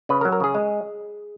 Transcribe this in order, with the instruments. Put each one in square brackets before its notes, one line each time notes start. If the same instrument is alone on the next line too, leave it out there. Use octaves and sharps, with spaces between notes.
[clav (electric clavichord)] C#3 B4
A#4
F#3
A#4
C#3 G#4
G#3